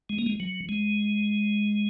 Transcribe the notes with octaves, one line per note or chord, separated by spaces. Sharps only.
G#3
A#3
G#3
F#3
G#3